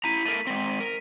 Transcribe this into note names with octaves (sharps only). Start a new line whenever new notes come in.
E4 A#5 B6 D#7
A3 A#4 D#7
G#3 C4
A#4